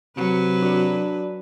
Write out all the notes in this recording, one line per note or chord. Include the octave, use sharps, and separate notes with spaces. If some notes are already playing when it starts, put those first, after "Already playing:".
C3 F#3 B4
D4 F#4